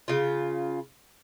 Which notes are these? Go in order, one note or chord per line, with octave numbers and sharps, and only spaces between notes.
C#3 F4